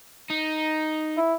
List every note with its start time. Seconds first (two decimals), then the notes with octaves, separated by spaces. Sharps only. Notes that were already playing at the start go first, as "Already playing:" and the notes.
0.30 D#4
1.17 E4